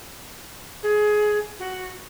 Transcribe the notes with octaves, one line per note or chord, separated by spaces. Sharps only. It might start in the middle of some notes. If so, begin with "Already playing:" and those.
G#4
F#4